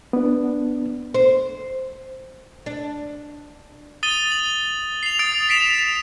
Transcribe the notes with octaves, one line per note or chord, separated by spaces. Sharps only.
B3 D4
C5
D4
D#6 A6 D#7 G7
F#7
C7 F7
D#6 A6 D7
B6 C7 D7 E7